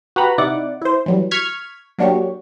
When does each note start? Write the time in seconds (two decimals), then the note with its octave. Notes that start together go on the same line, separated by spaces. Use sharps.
0.16 F#4 G4 B4 F#5 A#5 B5
0.38 C3 D#4 E4 D5 F#5 D6
0.82 E4 C5
1.06 E3 F#3 G3
1.31 C#6 F6 G#6 B6
1.98 F#3 A#3 D4 F#4 G4 C#5